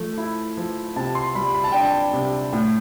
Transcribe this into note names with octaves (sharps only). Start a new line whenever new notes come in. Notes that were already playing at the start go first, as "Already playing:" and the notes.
Already playing: F3 A3
E4
F3
C3 A5
C6
G3 B5
B5
A5
D4 G5
A5
C3
A2